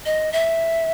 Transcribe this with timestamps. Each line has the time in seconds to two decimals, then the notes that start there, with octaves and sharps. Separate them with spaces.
0.05 D#5
0.32 E5